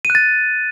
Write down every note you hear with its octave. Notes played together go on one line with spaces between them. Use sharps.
D#7
F#6
A6